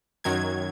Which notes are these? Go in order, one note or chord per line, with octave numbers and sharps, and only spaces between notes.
F#2 D#3 F#3 G#6